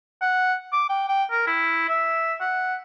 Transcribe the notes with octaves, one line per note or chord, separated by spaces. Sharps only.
F#5
D6
G5
G5
A#4
E4
E5
F#5